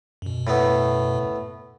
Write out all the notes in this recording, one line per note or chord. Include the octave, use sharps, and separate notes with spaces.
F#2 B2
A2 A3 B3